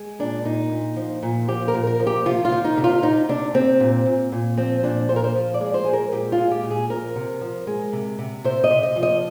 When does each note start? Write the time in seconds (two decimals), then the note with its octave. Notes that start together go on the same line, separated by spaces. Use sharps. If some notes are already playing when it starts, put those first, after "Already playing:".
Already playing: G#3
0.19 A#2 D4
0.45 A#2 D#4
0.71 A#2
0.96 F3
1.23 A#2
1.48 F3 G4
1.68 A#4
1.74 A#2
1.87 A#4
2.00 F3
2.07 G4
2.26 C3 F4
2.45 F4
2.52 D#3
2.64 D#4
2.77 C3
2.84 F4
3.02 C3 D#4
3.29 C3 D4
3.54 C3 C4
3.80 A#2
4.06 A#2
4.32 A#2
4.57 F3 C4
4.83 A#2 D4
5.09 A#2 C5
5.16 A#4
5.24 C5
5.36 F3
5.54 D5
5.61 G#3
5.74 C5
5.84 G#3 G#4
5.93 A#4
6.12 A#2 G4
6.32 F4
6.38 G#3
6.51 G4
6.64 A#2
6.71 G#4
6.90 F3 A#4
7.16 C3
7.41 F3
7.67 G#3
7.93 C3
8.19 C3
8.44 C3 C5
8.64 D#5
8.70 C3
8.83 D#5
8.96 F3
9.03 D#5